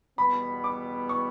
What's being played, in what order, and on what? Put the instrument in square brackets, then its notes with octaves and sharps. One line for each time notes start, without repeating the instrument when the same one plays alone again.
[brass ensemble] E2 B2 G3 B3 [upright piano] B5
[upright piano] D6
C#6